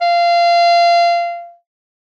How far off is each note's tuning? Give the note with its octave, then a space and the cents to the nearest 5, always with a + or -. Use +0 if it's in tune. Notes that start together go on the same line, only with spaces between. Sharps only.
F5 -20